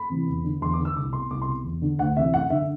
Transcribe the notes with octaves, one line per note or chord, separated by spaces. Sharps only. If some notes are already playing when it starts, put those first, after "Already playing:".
Already playing: B5
C3 E3
E2
D3
E2 C6
D6
D3
E6
C2 D6
B2 C6
C2 D6
C6
B2
E2
D3
D2 F#5
C3 E3 E5
F#2 F#5
D3 E5